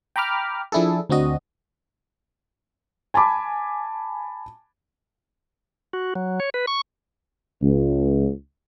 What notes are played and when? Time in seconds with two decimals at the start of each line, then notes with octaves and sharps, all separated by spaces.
0.16 G5 A#5 B5 D6 F6
0.72 F3 D4 E4 G#4 A4
1.10 D2 C4 D4 F#4 D#5
3.14 G#5 A5 B5 D6
5.93 F#4
6.15 F#3
6.40 C#5
6.54 B4
6.67 C#6
7.62 C#2